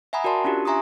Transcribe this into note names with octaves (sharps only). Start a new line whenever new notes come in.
E5 F#5 G#5 A#5 B5 D#6
F#4 A#4 D5 A5 C6
C#4 D4 F4 G4
E5 G#5 A#5 C6 C#6 D#6